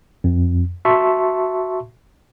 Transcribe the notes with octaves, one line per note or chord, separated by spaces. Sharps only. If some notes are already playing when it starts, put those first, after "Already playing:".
F2
F#4 E5 A5 C6 C#6